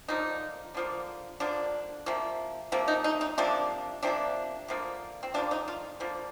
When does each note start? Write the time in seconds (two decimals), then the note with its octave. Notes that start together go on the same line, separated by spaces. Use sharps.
0.08 D3 F3 A#3 D#4
0.75 D3 F3 A#3
1.40 D3 F3 A#3 D4
2.06 C3 F3 A#3
2.72 C3 F3 A#3
2.88 D#4
3.04 D#4
3.21 D#4
3.38 C3 F3 A#3 D4
4.03 C3 F3 A#3 D4
4.68 D3 F3 A#3
5.23 C4
5.34 D3 F3 A#3 D4
5.51 D#4
5.68 F4
6.00 D3 F3 A#3